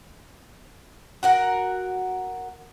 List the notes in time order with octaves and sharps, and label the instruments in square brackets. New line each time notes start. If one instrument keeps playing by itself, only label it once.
[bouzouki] F#4 A#4 F#5